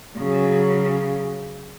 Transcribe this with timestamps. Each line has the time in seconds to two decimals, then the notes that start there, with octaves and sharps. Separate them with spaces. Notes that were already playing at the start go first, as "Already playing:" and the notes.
0.18 C#3 F#3